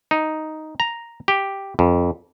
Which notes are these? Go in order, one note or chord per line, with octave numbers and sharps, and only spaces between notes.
D#4
A#5
G4
F2